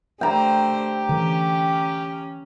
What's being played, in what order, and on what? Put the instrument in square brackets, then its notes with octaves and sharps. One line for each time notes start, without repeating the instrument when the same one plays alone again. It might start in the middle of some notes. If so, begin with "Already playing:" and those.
[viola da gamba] D3 A3 C5 [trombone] G4 [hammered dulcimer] G5 A#5
[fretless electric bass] D3 E3 [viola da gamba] C#4